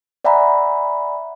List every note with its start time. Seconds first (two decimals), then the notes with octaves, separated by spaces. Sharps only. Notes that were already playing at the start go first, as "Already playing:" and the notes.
0.25 D5 E5 F#5 G#5 A#5 B5